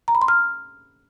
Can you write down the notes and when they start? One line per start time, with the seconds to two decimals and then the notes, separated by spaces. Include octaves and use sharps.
0.08 A#5
0.15 B5
0.22 C6
0.28 F6